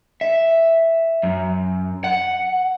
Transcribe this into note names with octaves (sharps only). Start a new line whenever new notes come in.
E5
F#2
F#5